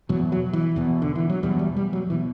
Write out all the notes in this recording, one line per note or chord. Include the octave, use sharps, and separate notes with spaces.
E2 B2 F#3
F#3
E3
E2 B2
D3
E3
F#3
E2 B2 G3
G3
G3
F#3
B2 E3